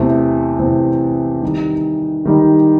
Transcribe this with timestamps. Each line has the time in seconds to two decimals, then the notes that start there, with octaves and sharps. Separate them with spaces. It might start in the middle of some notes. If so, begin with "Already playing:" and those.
Already playing: E2 C3 E3 A3 C4
0.59 E2 C3 E3 A3 C4
1.42 D#3 G3 D#4
2.25 D#3 G3 D#4